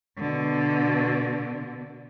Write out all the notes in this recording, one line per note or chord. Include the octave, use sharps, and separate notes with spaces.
B2 D3